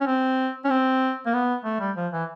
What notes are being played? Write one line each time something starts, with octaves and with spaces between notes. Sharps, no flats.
C#4
C4
C#4
C4
A#3
B3
A3
G3
F3
E3